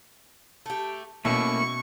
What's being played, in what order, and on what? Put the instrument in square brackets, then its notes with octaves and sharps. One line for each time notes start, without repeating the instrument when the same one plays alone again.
[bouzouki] A3 G4
[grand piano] B2 [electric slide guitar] A3 A#3 C#4 [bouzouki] E4 [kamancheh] C#6